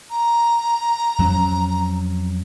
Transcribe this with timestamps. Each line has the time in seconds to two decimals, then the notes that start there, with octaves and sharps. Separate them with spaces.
0.11 A#5
1.19 F2 F#3 C#4